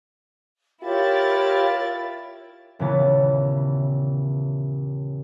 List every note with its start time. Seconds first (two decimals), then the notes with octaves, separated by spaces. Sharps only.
0.84 E4 F4 G4 A#4 C#5 A6
2.79 D#1 C#3 E3 B3 A6